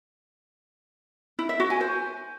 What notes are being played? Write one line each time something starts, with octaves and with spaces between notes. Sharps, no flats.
E4
E5
F#4
G#5
C5